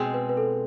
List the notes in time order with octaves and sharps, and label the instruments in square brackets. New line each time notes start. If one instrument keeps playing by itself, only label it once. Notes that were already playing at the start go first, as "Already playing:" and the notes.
Already playing: [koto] B2 G#3 C4
[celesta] B4
B4
A4